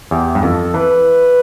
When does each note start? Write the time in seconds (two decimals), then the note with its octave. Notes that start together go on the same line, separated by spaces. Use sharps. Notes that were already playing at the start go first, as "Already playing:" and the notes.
0.11 E2 G4
0.35 G2
0.42 F2 A4
0.74 E3 B4